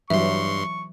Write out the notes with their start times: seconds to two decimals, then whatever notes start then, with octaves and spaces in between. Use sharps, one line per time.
0.10 G2 E3 F#3 E5 C6 C#6